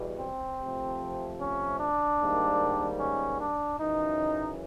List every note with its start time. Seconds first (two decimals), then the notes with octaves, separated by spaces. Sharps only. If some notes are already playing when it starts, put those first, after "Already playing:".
Already playing: E2 B2 G3
0.20 C4
0.60 C3 F3 A3
1.40 C#4
1.80 D4
2.20 G#2 D#3 G3 A#3
3.00 C#4
3.40 D4
3.80 F#2 C#3 E3 D#4